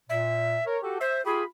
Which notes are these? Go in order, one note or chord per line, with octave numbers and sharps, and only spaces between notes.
A#2 E5
A#4 C#5
F#4 G4 A4
C5 E5
F4 G4 G#4 B5